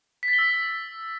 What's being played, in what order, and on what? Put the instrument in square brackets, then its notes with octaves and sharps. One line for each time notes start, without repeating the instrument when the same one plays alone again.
[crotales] B6
A6
G7
E6